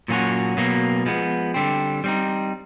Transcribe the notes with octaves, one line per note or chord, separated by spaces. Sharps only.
A#2 F#3 A#3 C#4 F#4
B2 F#3 A#3
F3 G#3 B3
D3 G3 C4
G3 C4 D#4